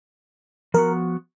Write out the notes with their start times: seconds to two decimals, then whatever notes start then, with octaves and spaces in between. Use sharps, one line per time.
0.74 F3 B3 F#4 A#4